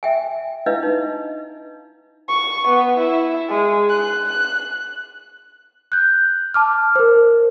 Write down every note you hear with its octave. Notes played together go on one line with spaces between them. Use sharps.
E5 G5 G#5
D4 E4 B4 D#5 F5
D#4
C#6
B3
E4
G#3
F#6
F#6 G6
A5 D6 F6
A#4 C5